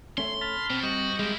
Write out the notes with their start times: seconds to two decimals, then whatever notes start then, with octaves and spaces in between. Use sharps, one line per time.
0.18 A3 C#4 C6
0.41 A5 B5 F6
0.70 B2 C4
0.83 G3 F#4 D#5
1.19 G#3 A#3 E4